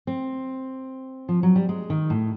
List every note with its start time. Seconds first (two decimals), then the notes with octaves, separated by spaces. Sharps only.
0.07 C4
1.29 F3
1.43 F#3
1.56 G3
1.69 G#3
1.90 D#3
2.10 A2